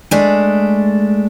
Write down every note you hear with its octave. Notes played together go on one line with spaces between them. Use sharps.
G#3 A3 D4